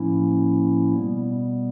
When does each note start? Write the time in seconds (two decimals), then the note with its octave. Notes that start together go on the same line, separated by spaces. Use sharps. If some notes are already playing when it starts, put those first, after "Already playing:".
Already playing: A2 F3 A#3 C#4 E4
0.94 B2 G3 B3